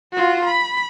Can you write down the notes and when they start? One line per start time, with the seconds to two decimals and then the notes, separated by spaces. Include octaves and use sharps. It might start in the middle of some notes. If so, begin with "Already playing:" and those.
0.12 F4 F#4
0.45 B5